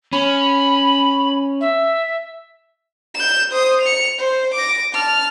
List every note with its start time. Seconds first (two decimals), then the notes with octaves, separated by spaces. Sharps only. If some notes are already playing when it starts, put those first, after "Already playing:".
0.13 C#4 B5
1.61 E5
3.15 G6 E7
3.52 C5 D#6
3.82 C#7 F7
4.18 C5
4.54 D6 A#6
4.93 A5 F6